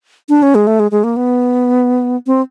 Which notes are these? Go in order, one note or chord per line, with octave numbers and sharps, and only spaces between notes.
D4
C#4
G#3
A3
G#3
G#3
A#3
B3
C4